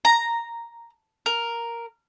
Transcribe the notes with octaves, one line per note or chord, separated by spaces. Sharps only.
A#5
A#4